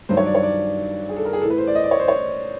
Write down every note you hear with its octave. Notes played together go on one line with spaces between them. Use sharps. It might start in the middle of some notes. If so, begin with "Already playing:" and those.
G2 D#3 F#3 C5
C#5
D5
C#5
D5
G#4
A4
A#4
G#4
A2 E3 A4
B4
C5
D5
D#5
D5
C#5
C5
C#5